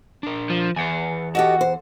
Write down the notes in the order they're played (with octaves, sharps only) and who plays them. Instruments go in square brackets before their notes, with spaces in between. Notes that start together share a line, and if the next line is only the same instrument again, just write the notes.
[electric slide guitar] D4 A#4
[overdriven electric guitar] F3
[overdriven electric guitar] E2 [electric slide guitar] B4 F#5 G#5
[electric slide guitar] F#4 [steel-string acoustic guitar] G4 A4 D#5 [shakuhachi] F#5
[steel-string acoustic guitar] C5